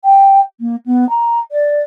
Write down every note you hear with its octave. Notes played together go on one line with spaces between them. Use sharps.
G5
A#3
B3
A#5
D5